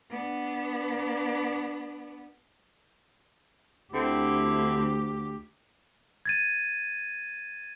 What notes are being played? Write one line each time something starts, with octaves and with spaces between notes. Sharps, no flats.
B3 D4
D2 D3 C4 E4 G4
G#6 A6 D#7